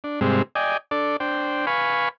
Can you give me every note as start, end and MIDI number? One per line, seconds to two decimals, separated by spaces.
0.04 0.20 62
0.21 0.42 44
0.21 0.42 48
0.21 0.42 55
0.21 0.42 56
0.21 0.42 60
0.55 0.77 74
0.55 0.77 75
0.55 0.77 79
0.55 0.77 80
0.91 1.17 62
0.91 1.17 69
0.91 1.17 74
1.20 1.66 62
1.20 1.66 72
1.20 1.66 79
1.67 2.09 71
1.67 2.09 77
1.67 2.09 80
1.67 2.09 83
1.67 2.09 85